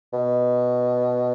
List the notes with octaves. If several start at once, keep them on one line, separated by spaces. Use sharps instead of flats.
B2